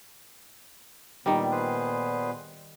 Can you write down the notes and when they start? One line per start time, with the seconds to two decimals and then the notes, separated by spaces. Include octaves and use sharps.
1.26 A#2 D#3 G3 B3
1.51 G#4 B4 C5